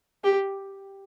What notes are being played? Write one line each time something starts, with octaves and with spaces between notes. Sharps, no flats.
G4